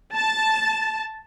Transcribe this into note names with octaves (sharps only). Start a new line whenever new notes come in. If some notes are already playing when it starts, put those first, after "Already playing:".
A5